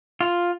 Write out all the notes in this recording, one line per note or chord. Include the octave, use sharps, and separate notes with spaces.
F4